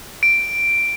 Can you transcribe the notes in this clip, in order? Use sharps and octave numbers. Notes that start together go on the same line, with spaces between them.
D7